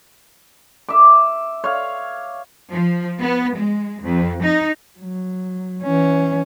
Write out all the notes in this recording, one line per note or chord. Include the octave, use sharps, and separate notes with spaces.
E5 D6
C#5 F5
F3
B3
G#3
F2
D#4
F#3
E3 C#4